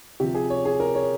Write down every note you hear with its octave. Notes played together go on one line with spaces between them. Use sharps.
C3 F3 G4
G#4
C#5
G#4
A#4
C#5